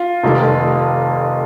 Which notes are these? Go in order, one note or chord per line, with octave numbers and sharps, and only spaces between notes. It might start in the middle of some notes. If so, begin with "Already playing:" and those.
Already playing: F4
F1 F2 D#3 G3